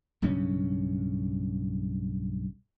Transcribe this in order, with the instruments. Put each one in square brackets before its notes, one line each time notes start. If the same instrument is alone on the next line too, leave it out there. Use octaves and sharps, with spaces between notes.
[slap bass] B1 G2 C#3 C#4